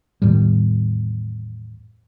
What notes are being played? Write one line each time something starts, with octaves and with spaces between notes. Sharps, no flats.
E2 A2 D#3 G3